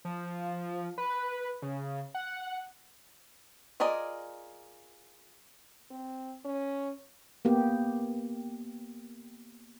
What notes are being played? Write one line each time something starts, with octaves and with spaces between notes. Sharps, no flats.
F3
B4
C#3
F#5
F4 G#4 A#4 D5 D#5
C4
C#4
A#3 B3 G4